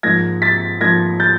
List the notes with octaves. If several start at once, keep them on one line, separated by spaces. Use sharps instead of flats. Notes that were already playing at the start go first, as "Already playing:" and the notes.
G#2 F3 A#3 G#6 A#6
A6 B6
G#2 F3 A#3 G#6 A#6
G6 A6